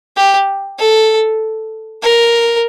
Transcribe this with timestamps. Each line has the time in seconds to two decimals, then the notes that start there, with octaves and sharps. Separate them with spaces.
0.17 G4
0.79 A4
2.02 A#4